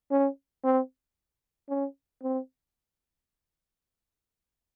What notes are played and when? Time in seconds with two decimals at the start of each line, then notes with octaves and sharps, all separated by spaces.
0.11 C#4
0.64 C4
1.69 C#4
2.23 C4